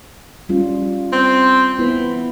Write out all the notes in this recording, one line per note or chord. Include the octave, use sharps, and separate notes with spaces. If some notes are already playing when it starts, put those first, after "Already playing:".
G3 C#4 F4
C4
E3 B3 E4